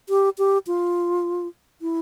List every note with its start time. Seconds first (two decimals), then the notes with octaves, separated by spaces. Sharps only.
0.09 G4
0.38 G4
0.67 F4
1.82 E4